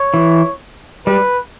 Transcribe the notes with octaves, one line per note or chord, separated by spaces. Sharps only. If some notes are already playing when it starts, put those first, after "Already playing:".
Already playing: C#5
E3
G3 B4